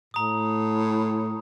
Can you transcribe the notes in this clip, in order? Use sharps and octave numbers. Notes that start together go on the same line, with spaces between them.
A2 A#5 D#6